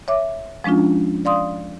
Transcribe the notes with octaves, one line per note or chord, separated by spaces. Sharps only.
C#5 E5 D6
F3 G#3 C#4 D4 F4
D5 F5 C6 D#6